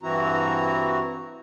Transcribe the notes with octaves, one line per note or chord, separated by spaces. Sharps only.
G2 E3 C4 E4 F#4 A#5